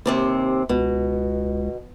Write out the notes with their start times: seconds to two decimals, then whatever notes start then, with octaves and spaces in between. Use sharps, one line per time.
0.06 D#2 C3 C4
0.69 C#2 B2